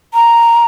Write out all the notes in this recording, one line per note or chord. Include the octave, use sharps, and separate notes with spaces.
A#5